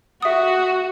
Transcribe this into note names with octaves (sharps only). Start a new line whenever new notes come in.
F#4 E5 D#6